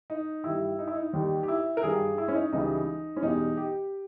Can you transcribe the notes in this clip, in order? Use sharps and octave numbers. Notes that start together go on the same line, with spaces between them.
D#4
G2 D#3 G3 E4
D#4
E4
D#4
D#2 D#3 G3
G4
E4
A#4
G2 D#3 G3 G#4
E4
C#4
D#4
C#2 C#3 E3 G3 D#4
C#4
E2 B2 G3 D#4
G4